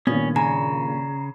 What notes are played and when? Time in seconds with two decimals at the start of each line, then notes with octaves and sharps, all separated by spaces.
0.07 G2 A#2 D#3 B3 C#4
0.36 C#3 G#5 A#5